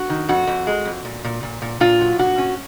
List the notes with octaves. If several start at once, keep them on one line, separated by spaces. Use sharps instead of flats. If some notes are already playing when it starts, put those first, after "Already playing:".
Already playing: F#4
D#3
F2 F#4
F2
G#3
F2
A#2
A#2
A#2
A#2
A#2 F4
F#3
A#2 F#4
C#4